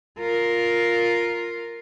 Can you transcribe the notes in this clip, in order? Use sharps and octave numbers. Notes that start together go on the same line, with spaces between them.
F4 A#4